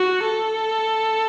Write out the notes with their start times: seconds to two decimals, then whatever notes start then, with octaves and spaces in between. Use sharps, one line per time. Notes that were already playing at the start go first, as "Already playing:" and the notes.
Already playing: F#4
0.25 A4